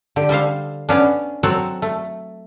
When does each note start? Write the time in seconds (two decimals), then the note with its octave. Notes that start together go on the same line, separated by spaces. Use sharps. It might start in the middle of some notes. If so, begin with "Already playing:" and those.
0.16 D3 G4
0.29 G3 A4 C5 F5
0.89 B3 C#4 D4
1.43 F#3 C4 F#4 A4
1.82 A3